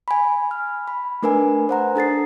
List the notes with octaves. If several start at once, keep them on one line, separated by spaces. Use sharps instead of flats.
G#5 B5
F6
B5
A3 D4 A#4 B4 G#5
C5 F#5 A#5
D4 A4 A6 C7